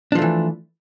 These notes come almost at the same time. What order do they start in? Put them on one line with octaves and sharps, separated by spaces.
D4 F3 A3 E3